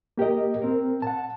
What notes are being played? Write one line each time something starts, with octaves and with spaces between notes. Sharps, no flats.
A#3 G4 A#4 D#5
C4 A#4
F#5 A5